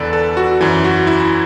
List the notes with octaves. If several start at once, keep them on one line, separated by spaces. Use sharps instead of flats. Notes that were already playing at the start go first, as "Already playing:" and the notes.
Already playing: E2 D3 A4 B4 D5
A4
F#4
F#2 E3
F#4
E4